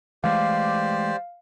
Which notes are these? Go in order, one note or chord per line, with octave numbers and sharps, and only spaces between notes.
E3 G#3 A3 G4 C5 D5 F5